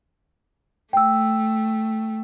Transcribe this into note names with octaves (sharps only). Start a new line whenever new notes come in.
A3 G5 E6